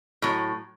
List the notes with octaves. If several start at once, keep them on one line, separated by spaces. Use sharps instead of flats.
A2 F#3